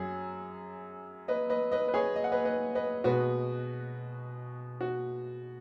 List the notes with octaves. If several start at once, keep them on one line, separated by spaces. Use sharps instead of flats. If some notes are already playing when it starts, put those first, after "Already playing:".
Already playing: F#2 F#3 G#4
B4 D#5
B4 D#5
B4 D#5
B4
G#4 C#5
D#5
F#5
B4 D#5
B4 D#5
B4 D#5
B2 G#3 F#4 B4
F#4